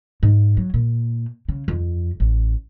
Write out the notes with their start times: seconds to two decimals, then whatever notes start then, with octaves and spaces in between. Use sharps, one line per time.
0.23 G#2
0.57 F#3
0.74 A#2
1.49 C#3
1.68 F2
2.20 A1